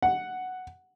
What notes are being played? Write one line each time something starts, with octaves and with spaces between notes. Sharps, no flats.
F#5